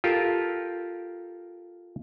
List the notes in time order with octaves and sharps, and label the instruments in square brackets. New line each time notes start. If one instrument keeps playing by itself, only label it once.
[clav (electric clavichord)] F4 G4 A4 A#4